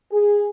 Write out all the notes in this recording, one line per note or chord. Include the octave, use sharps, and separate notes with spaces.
G#4